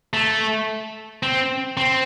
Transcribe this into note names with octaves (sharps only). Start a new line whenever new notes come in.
A3
C4
C4